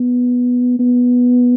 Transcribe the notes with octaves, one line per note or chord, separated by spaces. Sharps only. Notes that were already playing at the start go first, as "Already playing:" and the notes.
Already playing: B3
B3